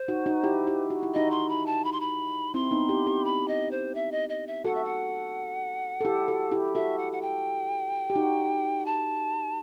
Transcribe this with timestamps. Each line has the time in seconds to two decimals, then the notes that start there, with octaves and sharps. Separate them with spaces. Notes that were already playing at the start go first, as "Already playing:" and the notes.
Already playing: C5
0.08 D#4 F#4
0.26 D#4 F#4
0.44 E4 G4
0.67 E4 G4
0.90 F#4
1.03 E4
1.14 D#4 F#4 D#5
1.31 C6
1.49 B5
1.66 A5
1.84 B5
1.92 C6
2.00 B5
2.54 C4 E4 C6
2.71 B3 D#4
2.89 E4 G4
3.06 E4 G4
3.25 B5
3.48 D#5
3.71 C5
3.95 E5
4.12 D#5
4.29 D#5
4.47 E5
4.65 F#4 A4 F#5
4.75 E5
4.84 F#5
6.01 A4
6.05 E4 G4
6.28 F#4 A4
6.52 E4 G4
6.75 F#4 A4 E5
6.98 F#5
7.12 F#5
7.22 G5
8.10 G4
8.16 D#4 F#4
8.86 A5